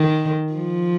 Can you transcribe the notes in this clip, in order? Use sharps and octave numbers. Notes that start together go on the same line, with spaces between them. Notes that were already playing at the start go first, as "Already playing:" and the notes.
Already playing: D#3
F3